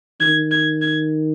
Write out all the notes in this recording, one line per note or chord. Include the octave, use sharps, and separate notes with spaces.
D#3 G#6
G#6
G#6